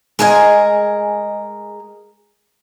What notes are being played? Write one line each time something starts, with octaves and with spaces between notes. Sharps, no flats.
G#3 G#4 A#4 D#5 F5 G#5